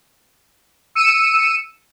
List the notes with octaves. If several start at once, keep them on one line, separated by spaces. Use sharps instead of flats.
E6 C#7 D#7 E7